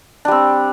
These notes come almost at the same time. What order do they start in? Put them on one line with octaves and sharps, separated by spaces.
D4 G3 C4